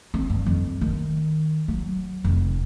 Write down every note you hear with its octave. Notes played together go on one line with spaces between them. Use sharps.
C4
G2
F2
D#3
F#3
F1